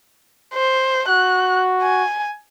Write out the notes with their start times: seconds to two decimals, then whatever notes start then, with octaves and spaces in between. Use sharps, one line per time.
0.54 C5
1.08 F#4 F#6
1.82 G#5